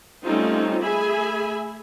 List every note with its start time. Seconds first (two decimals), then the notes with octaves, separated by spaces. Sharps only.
0.24 G3 A3 C4 C#4 D#4 F4
0.83 A3 G#4 E5 G#5 B5